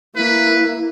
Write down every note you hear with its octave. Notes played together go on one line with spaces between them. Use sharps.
A#3 E4 B4